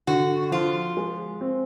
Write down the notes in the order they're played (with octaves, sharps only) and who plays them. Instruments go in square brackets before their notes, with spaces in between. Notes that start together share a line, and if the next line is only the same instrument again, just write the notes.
[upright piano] D3 [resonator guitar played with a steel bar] F#4
[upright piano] F3 [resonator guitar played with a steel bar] F4
[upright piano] G#3
C4